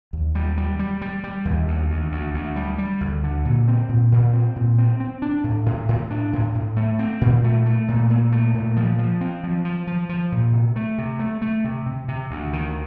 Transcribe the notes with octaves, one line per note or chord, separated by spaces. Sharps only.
D#2
G3
G3
G3
G3
G3
D#2
D2
D2
D2
D2
G3
G3
D2
D3
A#2
C4
A#2
A#2
C4
A#2
C4
C4
D4
A2
A2
A2
D4
A2
A2
A3
C4
A#2
A3
A3
A#2
A#2
A3
A#2
F3
F3
C4
F3
F3
F3
F3
A#2
C3
A3
C3
A3
A3
C3
C3
C3
D2
D#3